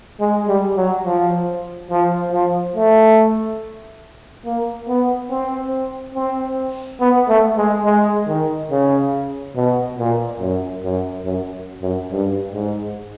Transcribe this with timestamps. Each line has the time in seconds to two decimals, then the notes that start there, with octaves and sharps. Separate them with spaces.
0.20 G#3
0.48 G3
0.77 F#3
1.05 F3
1.91 F3
2.32 F3
2.75 A3
4.45 A#3
4.88 B3
5.30 C4
6.15 C4
7.00 B3
7.28 A3
7.58 G#3
7.85 G#3
8.28 D#3
8.71 C#3
9.56 B2
9.99 A#2
10.40 F#2
10.84 F#2
11.25 F#2
11.82 F#2
12.11 G2
12.54 G#2